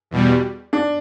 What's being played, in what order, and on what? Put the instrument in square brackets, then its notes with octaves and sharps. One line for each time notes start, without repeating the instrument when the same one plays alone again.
[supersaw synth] E2 B2 G3
[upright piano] D4